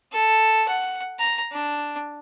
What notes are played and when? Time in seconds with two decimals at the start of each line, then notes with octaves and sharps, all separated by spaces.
0.12 A4
0.68 F#5
1.19 A#5
1.52 D4